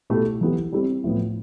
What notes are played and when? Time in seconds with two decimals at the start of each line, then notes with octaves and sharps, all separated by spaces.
0.10 B2 A3 E4 G4
0.41 E3 B3 E4 G4
0.72 G3 C4 E4 G4
1.04 A2 F3 B3